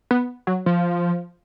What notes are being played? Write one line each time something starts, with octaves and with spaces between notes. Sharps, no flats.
B3
F#3
F3